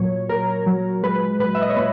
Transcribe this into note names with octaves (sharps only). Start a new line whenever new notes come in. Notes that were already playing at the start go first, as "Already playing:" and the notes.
Already playing: A#2 F#3 C#5
A#2 A#4
F#3
G#3 B4
A#2 B4
E5
D#5
C#5
A#2 B4